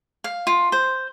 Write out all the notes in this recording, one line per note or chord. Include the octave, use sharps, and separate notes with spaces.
F5
F4
C5